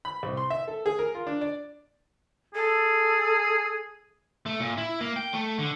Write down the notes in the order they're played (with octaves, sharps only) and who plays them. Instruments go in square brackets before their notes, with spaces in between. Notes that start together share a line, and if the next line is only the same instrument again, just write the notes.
[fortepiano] B5
C2
C6
E5
A4
G#4
A#4
F4
D4
D5
[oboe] G#4 [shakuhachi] A4
[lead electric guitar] A3
A#2
E4
A#3
G5
A3
D3